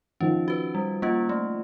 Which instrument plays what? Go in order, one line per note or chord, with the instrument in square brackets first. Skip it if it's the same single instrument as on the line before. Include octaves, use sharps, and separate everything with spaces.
[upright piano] D#3 F3 [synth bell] C#4
[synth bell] F#4 B4
G3
A#3 C#4 F4
A3